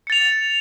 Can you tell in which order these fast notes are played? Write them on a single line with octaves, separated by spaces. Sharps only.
C#7 A6 F7